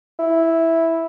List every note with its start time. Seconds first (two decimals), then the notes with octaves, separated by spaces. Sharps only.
0.19 E4